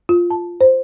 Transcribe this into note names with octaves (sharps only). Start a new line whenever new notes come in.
F4
A5
C5